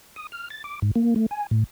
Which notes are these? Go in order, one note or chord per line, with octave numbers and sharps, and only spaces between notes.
D#6
F6
A6
D6
G#2
A#3
A3
G#5
A2